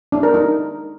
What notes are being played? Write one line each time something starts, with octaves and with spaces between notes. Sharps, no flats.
D4
A#4
D#4